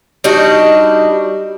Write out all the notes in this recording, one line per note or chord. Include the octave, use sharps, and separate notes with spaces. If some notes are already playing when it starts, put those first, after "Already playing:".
G3 D4 D#4 F#4